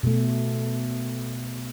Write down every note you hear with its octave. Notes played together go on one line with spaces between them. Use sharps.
B2 A3